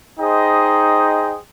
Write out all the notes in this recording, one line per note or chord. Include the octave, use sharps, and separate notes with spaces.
D#4 G#4 C5 D#5 G5